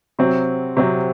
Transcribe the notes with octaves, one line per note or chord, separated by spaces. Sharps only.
C3 F#3 C4
C3 F#3 C4